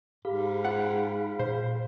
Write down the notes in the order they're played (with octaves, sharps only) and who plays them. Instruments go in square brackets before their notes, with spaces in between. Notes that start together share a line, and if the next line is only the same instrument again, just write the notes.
[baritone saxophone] G#2 [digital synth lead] G4 [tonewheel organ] G#4 F5 B5
[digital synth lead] F4 [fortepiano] F#5
[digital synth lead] G5
[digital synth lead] A#2 [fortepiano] C5